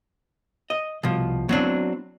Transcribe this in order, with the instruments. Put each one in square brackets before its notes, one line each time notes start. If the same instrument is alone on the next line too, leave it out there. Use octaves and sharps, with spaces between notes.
[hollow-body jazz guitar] D#5
[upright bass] C2 [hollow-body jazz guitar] B2 F3
[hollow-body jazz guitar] F#3 C4 D4 [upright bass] B3 E4